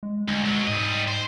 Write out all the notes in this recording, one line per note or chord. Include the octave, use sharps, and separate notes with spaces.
G#3
D2 G#3
B1 F#3
G#2 G3 D#5
C5